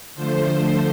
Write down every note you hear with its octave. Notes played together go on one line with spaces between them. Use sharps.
D3 F3 A3 C5